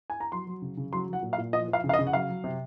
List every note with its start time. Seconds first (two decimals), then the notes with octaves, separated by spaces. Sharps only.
0.10 G#5
0.20 A#5
0.32 F#3 C6
0.47 F#3
0.62 C#3
0.77 C#3
0.93 F#3 C6
1.07 F#3
1.13 F#5
1.22 A#2
1.33 F5
1.38 A#2
1.53 F3 D#5
1.68 F3
1.73 F5
1.84 C#3
1.89 F5
1.93 D#5
1.99 C#3
2.07 F#5
2.13 F#3 F5
2.29 F#3
2.44 C3